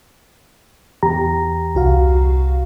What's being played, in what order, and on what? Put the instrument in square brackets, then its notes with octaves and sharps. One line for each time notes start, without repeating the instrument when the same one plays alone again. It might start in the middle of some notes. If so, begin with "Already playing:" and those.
[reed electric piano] E2 G4 A#5
[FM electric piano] C2 F#4 F5